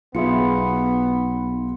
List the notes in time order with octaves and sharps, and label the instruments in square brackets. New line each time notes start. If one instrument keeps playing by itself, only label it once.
[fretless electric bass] B1 [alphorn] B3 [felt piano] F4 G#4 E5 [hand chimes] B5 C6 C#7